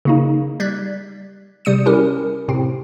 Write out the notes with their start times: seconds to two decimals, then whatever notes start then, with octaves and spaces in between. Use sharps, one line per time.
0.05 C#3 A#3 D#4
0.60 G3 D5 F#6 G#6 B6
1.65 C3 G3 D#6 C#7 D#7
1.86 C#4 E4 G4 A#4
2.48 A2 C3 C4